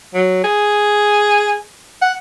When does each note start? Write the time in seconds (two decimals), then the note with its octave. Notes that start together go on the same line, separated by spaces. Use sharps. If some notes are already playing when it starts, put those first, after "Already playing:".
0.14 F#3
0.44 G#4
2.02 F#5